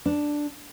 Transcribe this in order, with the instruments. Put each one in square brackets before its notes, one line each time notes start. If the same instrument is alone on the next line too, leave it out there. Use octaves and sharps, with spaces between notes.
[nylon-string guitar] D4